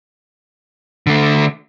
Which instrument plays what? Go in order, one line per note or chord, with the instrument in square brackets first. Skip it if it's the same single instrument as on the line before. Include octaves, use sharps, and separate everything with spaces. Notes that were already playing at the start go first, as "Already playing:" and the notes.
[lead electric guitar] D3 A3